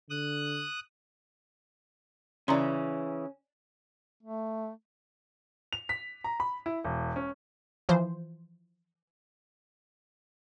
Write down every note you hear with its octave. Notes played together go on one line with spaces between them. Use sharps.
D3 D#6 F#6
C#3 E3 C#4 D5 A#5 C6
A3
F7
B6
A#5
B5
E4
E1
C#4
E3 F3 C5